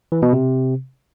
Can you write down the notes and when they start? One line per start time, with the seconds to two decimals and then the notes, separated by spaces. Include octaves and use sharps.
0.12 E3
0.22 B2
0.33 C3